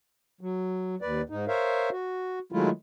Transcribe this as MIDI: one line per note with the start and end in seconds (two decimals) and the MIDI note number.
0.41 0.95 54
1.02 1.21 39
1.02 1.21 71
1.02 1.21 74
1.29 1.45 44
1.29 1.45 63
1.48 1.89 70
1.48 1.89 72
1.48 1.89 73
1.48 1.89 76
1.48 1.89 77
1.92 2.39 66
2.52 2.70 51
2.52 2.70 54
2.52 2.70 56
2.52 2.70 57
2.52 2.70 64
2.52 2.70 65